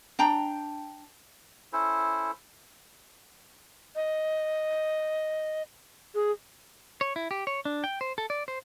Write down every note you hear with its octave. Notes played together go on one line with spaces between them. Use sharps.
D4 G5 A#5
C#4 E4 A4 C5
D#5
G#4
C#5
E4
G4
C#5
D4
G5
C5
A4
D5
C5